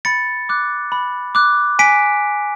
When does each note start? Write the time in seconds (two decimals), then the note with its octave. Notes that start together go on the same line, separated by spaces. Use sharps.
0.05 B5 A6 C#7
0.49 D6 F#6
0.92 B5
1.35 D6 F#6
1.79 G#5 B6 D7